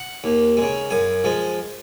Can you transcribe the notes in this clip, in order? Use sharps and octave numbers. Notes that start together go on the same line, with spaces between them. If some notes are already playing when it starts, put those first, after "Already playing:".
Already playing: F#5
D#2
C#3 G#3
F#2 G#5
F3 G#3